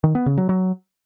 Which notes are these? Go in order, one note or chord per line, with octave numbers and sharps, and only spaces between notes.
D#3
B3
C#3
F#3
F#3